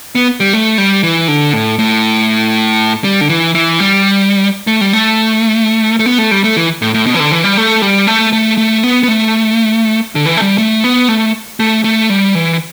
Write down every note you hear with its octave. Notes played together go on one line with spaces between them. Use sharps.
B3
G3
A3
G3
E3
D3
A2
A2
G3
D3
E3
E3
G3
A3
G3
A3
A3
B3
A3
G3
A3
E3
A2
A2
B2
E3
D3
E3
G3
A3
G3
A3
A3
A3
B3
B3
A3
D3
E3
A3
G3
A3
B3
A3
A3
A3
G3
E3